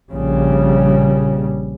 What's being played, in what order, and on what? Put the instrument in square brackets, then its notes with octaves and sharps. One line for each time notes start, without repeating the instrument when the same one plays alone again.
[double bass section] A#1 C#3 G3